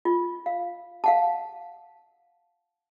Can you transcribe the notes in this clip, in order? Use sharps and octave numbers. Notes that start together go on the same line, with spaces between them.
F4
F5
F5 F#5 A5